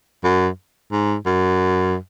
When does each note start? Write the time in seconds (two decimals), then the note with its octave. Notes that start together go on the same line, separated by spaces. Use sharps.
0.24 F#2
0.92 G#2
1.26 F#2